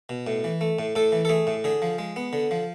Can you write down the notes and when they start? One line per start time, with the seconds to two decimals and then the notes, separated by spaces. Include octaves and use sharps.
0.09 B2
0.27 A2
0.44 E3
0.61 A3
0.79 A2
0.95 A2 A4
1.12 E3
1.25 A4
1.29 A3 G#4
1.47 A2
1.64 D3 G#4
1.82 F3
1.98 G#3
2.16 B3
2.33 D3
2.51 F3